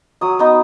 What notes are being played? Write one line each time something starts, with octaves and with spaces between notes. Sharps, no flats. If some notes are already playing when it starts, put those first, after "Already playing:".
F#3 D#6
B3 D#4